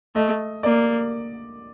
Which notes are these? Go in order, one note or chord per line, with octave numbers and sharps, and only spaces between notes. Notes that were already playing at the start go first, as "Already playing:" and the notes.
A3 D#5
A#3 D5